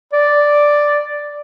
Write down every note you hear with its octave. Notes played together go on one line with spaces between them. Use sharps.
D5